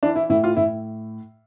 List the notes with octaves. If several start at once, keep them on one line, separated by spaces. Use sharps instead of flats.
E3 D4
E4
A2 E4
F4
A2 E4